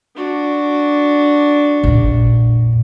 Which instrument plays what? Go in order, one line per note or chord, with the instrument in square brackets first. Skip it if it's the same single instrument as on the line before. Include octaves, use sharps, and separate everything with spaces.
[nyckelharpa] D4 F#4
[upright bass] A#1 F2